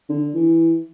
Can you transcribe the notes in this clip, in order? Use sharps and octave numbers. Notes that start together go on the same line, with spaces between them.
D3
E3